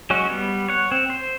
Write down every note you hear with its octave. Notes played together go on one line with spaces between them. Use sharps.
F#3 G#3 C#4 F#4
G3 B3
C#5 F#5
C4
C5